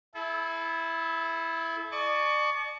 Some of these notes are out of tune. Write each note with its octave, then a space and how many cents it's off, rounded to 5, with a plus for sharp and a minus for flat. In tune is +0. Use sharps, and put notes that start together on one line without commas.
E4 +0 A4 -35
D5 +35 A5 -40 C#6 +20